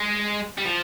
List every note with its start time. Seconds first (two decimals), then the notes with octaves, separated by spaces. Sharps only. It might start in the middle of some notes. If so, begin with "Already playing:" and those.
Already playing: G#3
0.58 G3
0.65 F3